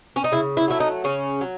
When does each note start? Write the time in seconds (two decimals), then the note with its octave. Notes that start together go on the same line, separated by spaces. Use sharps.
0.16 C#4
0.24 D#4
0.32 C#3 E4
0.57 E4
0.68 F#3 A3 E4
0.80 D#4
1.04 C#3 C#4
1.41 F#3